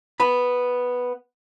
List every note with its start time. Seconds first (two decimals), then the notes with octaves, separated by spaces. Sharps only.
0.20 B3 B5